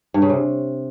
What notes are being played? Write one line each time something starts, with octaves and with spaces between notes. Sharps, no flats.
G2
C#3
C3